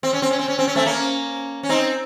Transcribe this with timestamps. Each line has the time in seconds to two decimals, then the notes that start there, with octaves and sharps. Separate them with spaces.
0.03 C4
0.13 C#4
0.22 C4
0.31 C#4
0.39 C4
0.48 C#4
0.59 C4
0.68 C#4
0.76 A3 C4
0.86 A#3 C#4
1.63 C#4
1.69 C4 D#4